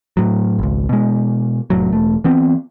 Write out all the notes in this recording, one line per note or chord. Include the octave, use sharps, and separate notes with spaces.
A2 F#3
G#1 C#2
B2 G#3
F1 A2 F#3
E1 A3
E3 B3 C4